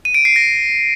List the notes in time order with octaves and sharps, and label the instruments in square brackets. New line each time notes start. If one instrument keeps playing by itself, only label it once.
[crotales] D#7
D7
C7
A#6